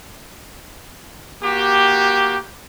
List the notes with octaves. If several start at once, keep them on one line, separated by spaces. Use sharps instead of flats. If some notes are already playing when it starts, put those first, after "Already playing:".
A#3 F#4 G4